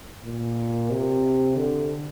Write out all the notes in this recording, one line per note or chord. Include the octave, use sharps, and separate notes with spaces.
A#2
C3
D3